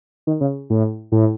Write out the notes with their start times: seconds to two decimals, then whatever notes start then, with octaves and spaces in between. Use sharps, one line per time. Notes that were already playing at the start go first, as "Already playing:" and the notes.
0.27 D#3
0.41 C#3
0.70 A2
1.12 A2